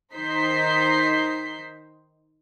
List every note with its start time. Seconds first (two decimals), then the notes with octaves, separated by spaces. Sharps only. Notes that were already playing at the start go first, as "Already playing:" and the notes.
0.14 D#3 D#4 C5 G6 B6 C7